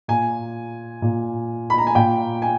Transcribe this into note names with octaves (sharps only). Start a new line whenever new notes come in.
A#2 G#5
A#2
B5
A#5
G#5
A#2 G5
G#5